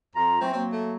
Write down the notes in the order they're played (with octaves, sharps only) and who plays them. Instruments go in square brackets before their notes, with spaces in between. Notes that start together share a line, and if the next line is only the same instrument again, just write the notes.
[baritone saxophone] F2 [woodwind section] F4 A#5
[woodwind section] E3 F#3 A3 [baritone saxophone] C4
[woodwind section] F#3 A#3 [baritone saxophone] C4
[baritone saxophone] A3